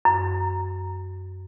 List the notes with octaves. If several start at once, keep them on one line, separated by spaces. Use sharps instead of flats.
F#2